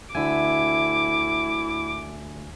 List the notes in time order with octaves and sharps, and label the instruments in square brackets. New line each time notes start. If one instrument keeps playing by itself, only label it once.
[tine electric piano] D2 D3 G#5 [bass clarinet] E4 [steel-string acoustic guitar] E5 [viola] D6